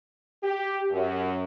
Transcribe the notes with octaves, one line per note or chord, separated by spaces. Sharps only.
G4
F#2